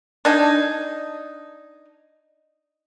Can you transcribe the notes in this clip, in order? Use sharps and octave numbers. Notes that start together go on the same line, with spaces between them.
D4 D#4 G#5